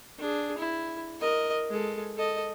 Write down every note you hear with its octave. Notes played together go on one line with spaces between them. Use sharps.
D4 G#4
E4
A#4 D#5
G#3 A4
A4 D#5